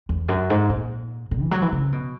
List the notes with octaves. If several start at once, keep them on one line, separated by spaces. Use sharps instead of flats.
E2
F#2
G#2
A#2
A#2
E3
F#3
E3
C#3
B2